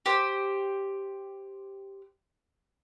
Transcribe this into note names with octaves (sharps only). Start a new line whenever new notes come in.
G4 C5